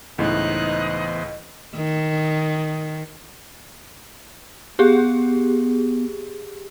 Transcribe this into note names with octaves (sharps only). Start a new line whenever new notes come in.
C#2 A2 E3 B3 D#4 C5 D#5 F#6
D#3
B3 G4 G#4